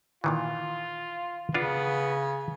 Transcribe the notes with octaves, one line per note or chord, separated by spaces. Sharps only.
A#2 D#3 E3 F4
C#3 B3 D4 F4